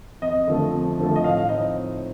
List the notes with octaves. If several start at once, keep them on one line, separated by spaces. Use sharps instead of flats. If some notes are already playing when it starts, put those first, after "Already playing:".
F2 D#5
D3 F3 A3
F2
D3 F3 A3
D#5
A2 F5
F5
F3 C4 D#4 D#5